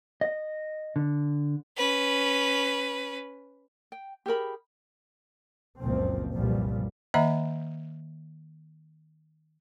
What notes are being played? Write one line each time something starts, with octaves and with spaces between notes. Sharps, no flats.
D#5
D3
C#4 B4
G5
G4 G#4 A#4 B5
F#1 C#2 A#2 F3 C4
C2 F#2 A#2 E3 F3 G3
D#3 A#3 D#5 E5 A#5